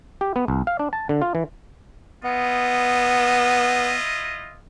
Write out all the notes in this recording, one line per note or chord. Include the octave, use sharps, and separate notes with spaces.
G4
B3
C2
F5
D4
A5
D3
F4
E3
B3 E4 F4 D#5